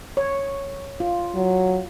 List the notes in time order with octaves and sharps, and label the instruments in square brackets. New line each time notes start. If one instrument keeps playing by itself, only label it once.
[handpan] C#5
F4
[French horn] F#3